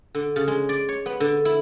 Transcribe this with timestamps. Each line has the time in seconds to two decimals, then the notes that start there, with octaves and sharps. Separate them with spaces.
0.15 D3
0.36 C#3
0.48 G#3
0.69 D5
0.89 C#5
1.06 B3
1.20 D3
1.45 E4